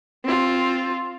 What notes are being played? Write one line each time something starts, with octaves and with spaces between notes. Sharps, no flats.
C4 F4